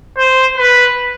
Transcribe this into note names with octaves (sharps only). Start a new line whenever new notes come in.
C5
B4